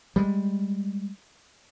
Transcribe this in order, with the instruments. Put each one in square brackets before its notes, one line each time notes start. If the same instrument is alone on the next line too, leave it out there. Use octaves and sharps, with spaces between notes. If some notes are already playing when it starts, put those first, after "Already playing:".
[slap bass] G3 G#3